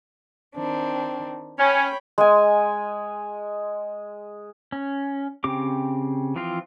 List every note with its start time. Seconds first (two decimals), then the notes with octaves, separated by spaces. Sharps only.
0.55 D#3 C4 D4
1.59 C#4 C#5 G5 B5
2.18 G#3 G#5
4.72 C#4
5.44 C#3 C4 G4 D6
6.36 E3 F3 C4 F4